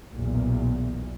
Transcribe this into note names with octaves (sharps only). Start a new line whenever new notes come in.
B1 E2 A#2